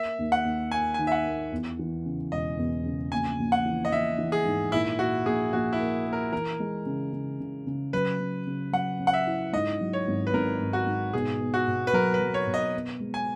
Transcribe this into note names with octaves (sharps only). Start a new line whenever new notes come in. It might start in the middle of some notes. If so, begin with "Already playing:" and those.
Already playing: A#3 E5
D#2
F#5
D#2
A#3 G#5
G#5
D#3
E5
F#5
A#3
E2
E3
C#3
E1 D#5
E2
C#3
A#1 G#5
A#1
F#5
E3
D#5
E3 E5
E3
G#4
G#2
A#2 E4
A#2 F#4
A#1 G#4
A#1 F#4
E4
A#3
A#3
A#4
E3 A#4
G#3
C#3
C#3
C#3
C#3
F#3 B4
C#3
C#3
F#3 F#5
C#4
F#5
E5
E4
G#2 D#5
F#3
C#5
G#1
B4
G#1 A#4
G#1
F#4
G#2
B2 G#4
B3
F#4
B2
B4
F#3 A#4
B4
F#3
C#5
B2
D#5
B3
G#3
G#5